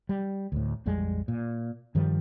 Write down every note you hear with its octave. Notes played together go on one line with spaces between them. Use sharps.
G3
D2 A2
A#1 F2 G3 G#3
A#2
G2 D#3 F3 G3